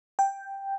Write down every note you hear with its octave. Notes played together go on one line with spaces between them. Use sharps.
G5